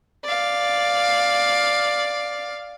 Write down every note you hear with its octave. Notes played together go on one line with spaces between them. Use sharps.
D5 F5